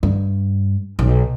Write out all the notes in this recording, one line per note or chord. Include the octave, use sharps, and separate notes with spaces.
G2
B1